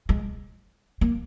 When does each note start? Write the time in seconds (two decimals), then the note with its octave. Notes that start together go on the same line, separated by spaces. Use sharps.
0.09 G#3
1.01 A#3